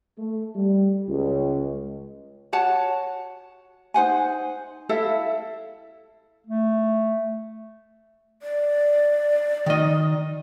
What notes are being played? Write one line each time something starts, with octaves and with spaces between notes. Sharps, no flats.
A3
G3
C#2
F#4 C#5 F#5 A5
D#4 C5 F#5 G#5
E4 A4 E5 F5
A3
D5
D#3 D#5